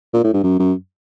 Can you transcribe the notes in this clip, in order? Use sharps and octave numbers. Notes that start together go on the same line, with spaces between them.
A#2
A2
G2
F#2
F#2